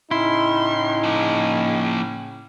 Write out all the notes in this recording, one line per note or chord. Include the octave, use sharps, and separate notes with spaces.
A2 C#3 C#4 D#4 E4 C6
F3 A#3